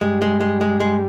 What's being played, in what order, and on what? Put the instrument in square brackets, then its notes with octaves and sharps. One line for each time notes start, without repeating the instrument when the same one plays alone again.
[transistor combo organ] G2 G3 [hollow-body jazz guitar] G#3
[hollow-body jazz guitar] G#3
G#3
G#3
G#3